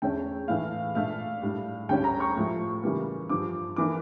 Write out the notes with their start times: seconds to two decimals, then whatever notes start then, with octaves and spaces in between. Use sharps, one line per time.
0.02 E2 D3 A3 C#4 G5
0.48 A2 E3 A3 F5
0.95 A#2 A3 D4 F5
1.42 A2 G3 D4
1.89 D2 D3 G3 C#4 G5
2.04 A#5
2.20 C#6
2.36 A2 F3 A3
2.83 C#3 E3 G3 A#3
3.29 G2 D3 F3 D6
3.76 E3 A#3 D4 D6